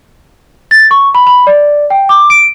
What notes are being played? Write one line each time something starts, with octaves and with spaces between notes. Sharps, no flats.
A6
C#6
B5
B5
D5
G5
D6
D7